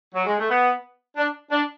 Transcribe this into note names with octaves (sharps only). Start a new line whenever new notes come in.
F#3
G#3
A3
B3
D4
D4